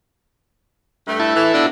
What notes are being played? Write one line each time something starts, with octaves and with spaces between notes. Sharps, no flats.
G2 A3
E4 A4
E3
B2 F3 D4